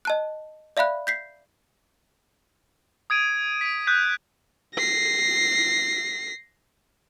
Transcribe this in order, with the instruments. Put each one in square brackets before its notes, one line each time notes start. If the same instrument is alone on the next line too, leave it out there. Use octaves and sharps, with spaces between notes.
[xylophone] D#5 A5 F#6
D5 E5 F5 B5 F#6
G6 B6 C7
[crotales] D#6 G#6 D7 D#7
B6 D7
D#6 F#6 G6 B6
[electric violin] A#6 C7